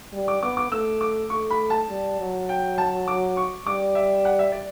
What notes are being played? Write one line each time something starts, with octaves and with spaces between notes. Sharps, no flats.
G3
D6
B3 D6
D6
A3 E6
D6
A3 C#6
B5
A5
G3
F#3
G5
A5
D6
C#6
G3 D6
E5
F#5
E5
D5